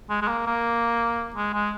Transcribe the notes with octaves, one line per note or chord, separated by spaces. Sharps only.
G#3
G#3
A#3
A#3
G#3
G#3